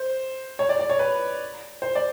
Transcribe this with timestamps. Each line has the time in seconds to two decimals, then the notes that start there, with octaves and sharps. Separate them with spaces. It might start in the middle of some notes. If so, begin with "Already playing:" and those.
Already playing: C5
0.59 C#5
0.69 D5
0.79 D5
0.90 C#5
0.99 B4
1.82 C5
1.95 D5